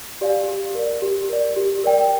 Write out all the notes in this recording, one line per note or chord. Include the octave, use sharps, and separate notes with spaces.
G4 D5 F5 G#5
G4
A#4 D5
G4
A#4 D5
G4
A#4 D5 G5